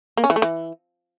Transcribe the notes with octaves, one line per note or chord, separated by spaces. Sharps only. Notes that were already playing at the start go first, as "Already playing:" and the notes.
A#3
C#4
E3
A3
E3